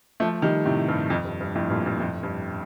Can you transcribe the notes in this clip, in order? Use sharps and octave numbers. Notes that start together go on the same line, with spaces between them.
F3 A3
D#3 G3
A2 C3
G2
F2
G2
G2
F2 A2
G2 A#2
G2
F2 A2
G2